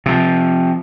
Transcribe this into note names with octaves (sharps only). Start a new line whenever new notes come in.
C3 F3